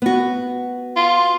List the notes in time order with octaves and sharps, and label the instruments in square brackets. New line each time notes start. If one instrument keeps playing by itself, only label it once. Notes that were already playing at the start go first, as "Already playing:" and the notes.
[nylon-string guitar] B3 F#4
[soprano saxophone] F4